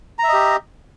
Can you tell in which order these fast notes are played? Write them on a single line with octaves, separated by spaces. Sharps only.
A#5 E5 D#5 G4